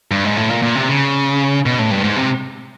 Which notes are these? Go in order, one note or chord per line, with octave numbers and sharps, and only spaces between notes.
G2
G#2
A2
A#2
A#2
C3
C#3
B2
A2
G2
G#2
C3